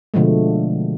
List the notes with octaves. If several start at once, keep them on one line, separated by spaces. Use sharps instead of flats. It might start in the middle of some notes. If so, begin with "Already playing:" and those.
B2 D3 F3 G#3 A3